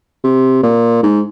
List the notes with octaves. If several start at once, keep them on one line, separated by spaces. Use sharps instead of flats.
C3
A#2
G#2